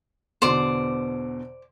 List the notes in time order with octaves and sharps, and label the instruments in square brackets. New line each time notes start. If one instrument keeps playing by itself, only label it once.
[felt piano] E2 B2 D3 [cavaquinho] C5 D5 D6